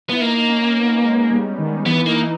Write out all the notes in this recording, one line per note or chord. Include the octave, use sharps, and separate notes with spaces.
B3 E4
A#3 D#4
C#4
B3
G#3
G3
D#3
E3 B3
A#3 D#4